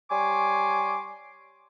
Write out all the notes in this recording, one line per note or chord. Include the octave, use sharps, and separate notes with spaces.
G3 C#5 G#5 C6 D6